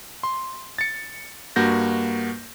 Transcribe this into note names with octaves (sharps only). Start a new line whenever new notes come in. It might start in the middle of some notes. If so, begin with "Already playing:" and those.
C6
A6 C#7
G2 A#3 F#4 G6 A#6